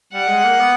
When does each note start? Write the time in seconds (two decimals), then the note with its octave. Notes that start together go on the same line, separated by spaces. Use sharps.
0.13 G3 F#5
0.28 G#3
0.44 A#3
0.60 B3